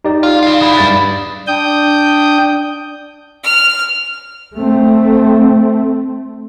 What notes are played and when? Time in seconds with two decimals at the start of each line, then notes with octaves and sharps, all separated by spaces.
0.05 D#4 G4 D5
0.23 F4
0.43 G#4 F5
0.61 E4 G#4
0.77 G2 D5 A6
1.47 D4 G5 D#6 G6
3.44 F6
4.57 A3 C4